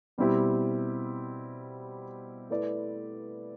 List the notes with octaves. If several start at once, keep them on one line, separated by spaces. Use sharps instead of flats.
B2 G3 C4 E4 G4
A3 E4 B4 D5